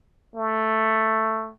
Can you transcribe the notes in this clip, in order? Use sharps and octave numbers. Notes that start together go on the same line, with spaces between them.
A3